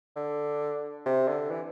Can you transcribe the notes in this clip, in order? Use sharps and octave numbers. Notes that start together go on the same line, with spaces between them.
D3
C3
D3
E3